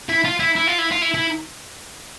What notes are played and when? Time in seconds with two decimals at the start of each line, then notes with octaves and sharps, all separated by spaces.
0.09 E4
0.24 F4
0.39 E4
0.56 E4
0.68 F4
0.79 E4
0.91 F4
1.02 E4
1.14 E4